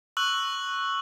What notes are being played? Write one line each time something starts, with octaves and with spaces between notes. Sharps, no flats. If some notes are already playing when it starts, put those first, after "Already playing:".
C#6 E6 F#6 F#7